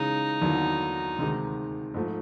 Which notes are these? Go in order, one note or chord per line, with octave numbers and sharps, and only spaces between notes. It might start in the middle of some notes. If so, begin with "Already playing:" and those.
Already playing: C#3 E3 G#3 C#4 D#4
D#2 D3 F#3 B3 E4
D2 C3 D#3 G#3
G#2 F3 A3